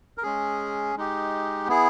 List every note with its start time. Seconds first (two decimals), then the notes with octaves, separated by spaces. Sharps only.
0.18 A#4
0.23 G#3 C#4 G#4
0.96 G#3 D#4 G4
1.68 B3 E4 G#4